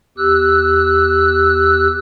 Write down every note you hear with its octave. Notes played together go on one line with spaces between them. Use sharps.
E2 G4 E6 F#6